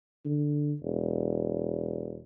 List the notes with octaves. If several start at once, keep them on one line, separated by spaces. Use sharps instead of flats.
D3
E1